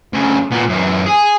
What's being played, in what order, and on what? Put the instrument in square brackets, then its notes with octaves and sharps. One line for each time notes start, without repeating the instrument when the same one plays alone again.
[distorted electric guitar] D2 C#3
A#2 B3
F#2 E3
G#4